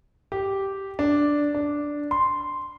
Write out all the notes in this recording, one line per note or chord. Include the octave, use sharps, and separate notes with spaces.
G4
D4
D4
C6